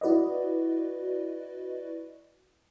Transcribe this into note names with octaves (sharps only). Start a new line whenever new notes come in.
E4 F#4 B4 D5 D#5